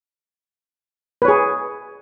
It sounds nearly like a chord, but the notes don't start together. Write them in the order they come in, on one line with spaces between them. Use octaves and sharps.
B4 C#5 G#4